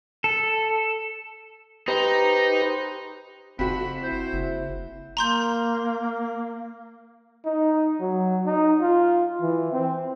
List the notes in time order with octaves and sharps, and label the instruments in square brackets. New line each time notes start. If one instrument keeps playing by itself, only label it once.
[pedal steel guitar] A4
[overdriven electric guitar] D#4 [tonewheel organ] G4 B4 C5
[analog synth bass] F#1 [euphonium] F2 [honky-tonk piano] C4 F#4 [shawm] B5
[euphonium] E4 [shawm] C5
[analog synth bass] F#1
[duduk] A#3 [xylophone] A#5 C6 G6
[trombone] D#4
F#3
D#4
F4
E3
C4